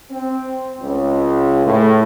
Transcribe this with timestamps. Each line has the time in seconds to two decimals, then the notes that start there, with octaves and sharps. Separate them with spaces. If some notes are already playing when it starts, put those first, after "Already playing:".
0.12 C4
0.80 C#2
1.66 A2